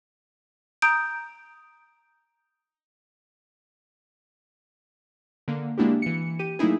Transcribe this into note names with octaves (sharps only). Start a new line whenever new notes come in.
A#5 D#6 G6 D7
D3 A#3
G#3 A#3 D4 E4 F#4 G4
E3 C#7
G4 D#7
F#3 A3 A#3 D#4 E4 G#4